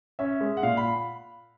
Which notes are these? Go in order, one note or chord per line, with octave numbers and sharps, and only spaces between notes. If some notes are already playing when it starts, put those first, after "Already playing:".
C#4 E5
G#3
F#5
A#2 F5
B5